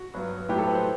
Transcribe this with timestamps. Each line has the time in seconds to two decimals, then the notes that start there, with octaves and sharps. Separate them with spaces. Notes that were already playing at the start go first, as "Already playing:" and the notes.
Already playing: F#4
0.14 G2 F#3 B3
0.49 A2 F#3 B3 G4
0.58 A4
0.67 B4
0.75 C5